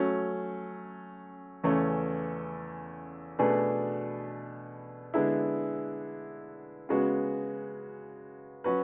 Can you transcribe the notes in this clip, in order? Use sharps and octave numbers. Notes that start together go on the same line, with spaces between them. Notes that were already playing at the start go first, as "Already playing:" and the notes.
Already playing: F#3 A3 C#4
E2 C#3 E3 A3 C#4
B2 A3 D4 G#4 B4
D3 G#3 B3 E4
C#3 G#3 B3 F#4
F#3 C#4 F#4 B4